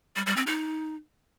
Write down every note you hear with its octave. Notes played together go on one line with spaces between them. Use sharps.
G3
G3
C4
D#4